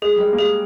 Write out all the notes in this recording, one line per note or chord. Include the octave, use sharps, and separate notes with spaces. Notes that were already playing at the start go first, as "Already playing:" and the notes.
G#3 G#4
G3
G#3
A#3
G#3 G#4